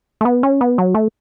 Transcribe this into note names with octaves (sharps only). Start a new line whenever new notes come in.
A3
B3
C#4
B3
F#3
A3